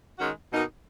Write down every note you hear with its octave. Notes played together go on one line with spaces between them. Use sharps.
D#3 G#3 C#4 F#4
B2 A#3 D#4 F#4